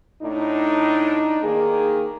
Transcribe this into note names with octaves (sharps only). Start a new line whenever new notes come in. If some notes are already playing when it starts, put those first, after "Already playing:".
A2 D4 D#4
D#3 A#3 G#4